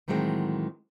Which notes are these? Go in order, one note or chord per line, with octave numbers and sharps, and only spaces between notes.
A2 D#3 E3 F#3 G#3 C4